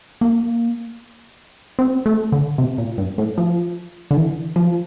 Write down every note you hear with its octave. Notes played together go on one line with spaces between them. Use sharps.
A#3
C4
A3
D3
C3
A#2
G2
A2
F3
D3
E3
F3